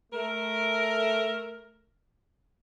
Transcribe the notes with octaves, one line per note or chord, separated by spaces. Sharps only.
A3 A#4